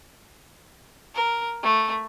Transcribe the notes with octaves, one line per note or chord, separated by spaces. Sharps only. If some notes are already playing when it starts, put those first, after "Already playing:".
A#4
A3